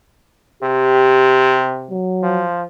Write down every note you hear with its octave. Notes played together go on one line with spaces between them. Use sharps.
C3 G4
F#3
F3